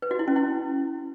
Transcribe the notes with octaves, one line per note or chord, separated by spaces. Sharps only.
B4
F#4
E4
C#4
E4